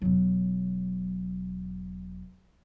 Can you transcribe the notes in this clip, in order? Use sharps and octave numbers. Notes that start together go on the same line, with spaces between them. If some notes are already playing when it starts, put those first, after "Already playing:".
E1 F#3